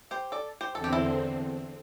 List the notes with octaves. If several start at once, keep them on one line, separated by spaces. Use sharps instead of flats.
G4 C5
A4 D5
G4 C5
E2 D3 C4 A4
G4
E4 A4